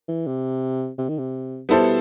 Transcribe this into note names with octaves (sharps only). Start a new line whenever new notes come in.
E3
C3
C3
D#3
C3
B2 G3 B3 E4 A4 C5